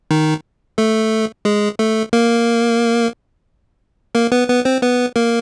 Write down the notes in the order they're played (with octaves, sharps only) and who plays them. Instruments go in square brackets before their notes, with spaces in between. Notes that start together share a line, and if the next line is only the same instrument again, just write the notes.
[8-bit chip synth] D#3 D#4
A3 A4
G#3 G#4
A3 A4
A#3 A#4
A#3 A#4
B3 B4
B3 B4
C4 C5
B3 B4
A#3 A#4